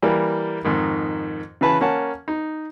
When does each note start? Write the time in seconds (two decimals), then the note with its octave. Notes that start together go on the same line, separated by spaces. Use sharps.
0.02 E3 G3 A#3
0.64 F2 G#2 D#3
1.61 C#3 E3 B4 A5
1.81 A#3 C#4 F#5 A5
2.28 D#4